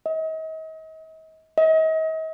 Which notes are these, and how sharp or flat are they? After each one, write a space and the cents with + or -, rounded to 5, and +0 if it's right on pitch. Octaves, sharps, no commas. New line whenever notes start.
D#5 +40
D#5 +40